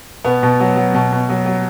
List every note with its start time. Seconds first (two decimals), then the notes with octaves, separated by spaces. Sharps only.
0.24 B2 B3
0.43 B2
0.60 F#3
0.77 F#3
0.94 B2
1.12 B2
1.29 F#3
1.46 F#3